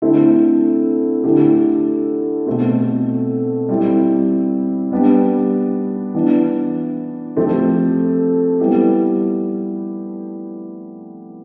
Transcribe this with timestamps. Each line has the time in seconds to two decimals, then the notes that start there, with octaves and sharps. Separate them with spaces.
0.02 D3 A3 C4 E4
1.24 D3 A3 E4 G4
2.47 B2 A3 C4
3.69 G3 C4 E4
4.91 G3 B3 D4 G4
6.14 E3 B3 D4
7.36 F3 A3 C4 G4
8.60 G3 B3 E4 G4